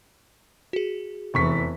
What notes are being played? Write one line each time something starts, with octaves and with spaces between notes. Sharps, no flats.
F#4 G#4
F1 E2 E3 C#6 B6